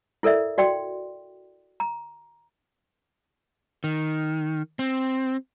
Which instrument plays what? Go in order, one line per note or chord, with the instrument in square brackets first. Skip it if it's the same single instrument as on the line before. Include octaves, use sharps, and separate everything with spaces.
[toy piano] E4 A4 A#4 D5 E5
F#4 D5 G5 C6
A#5
[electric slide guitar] D#3
C4